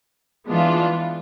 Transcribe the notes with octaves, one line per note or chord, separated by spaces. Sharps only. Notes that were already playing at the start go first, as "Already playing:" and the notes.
E3 G#3 B3 D4 F4